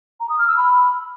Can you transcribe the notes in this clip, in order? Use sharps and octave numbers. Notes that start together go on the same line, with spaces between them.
A#5
D#6
F6
E6
B5